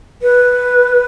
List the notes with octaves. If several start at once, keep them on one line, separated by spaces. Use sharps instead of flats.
B4